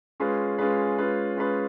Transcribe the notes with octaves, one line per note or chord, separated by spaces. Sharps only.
G#3 C#4 F4 G#4 B4
G#3 C#4 F4 G#4 B4
G#3 C#4 F4 G#4 B4
G#3 C#4 F4 G#4 B4